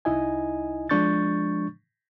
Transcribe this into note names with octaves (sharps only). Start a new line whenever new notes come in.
C2 D#4 E4 D#5 G#5
F3 G#3 D4 C#6 G6 A6